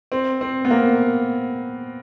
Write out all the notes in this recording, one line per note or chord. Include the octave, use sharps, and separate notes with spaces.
C4
C4
B3
A#3